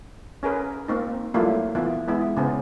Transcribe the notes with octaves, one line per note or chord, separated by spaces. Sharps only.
C#4 G#4 A#4 B4
A#3 C4 D#4
F#3 G3 A3 A#3 E4 F4
D#3 E3 B3 E4 F4
G#3 B3 E4
C#3 B3 C5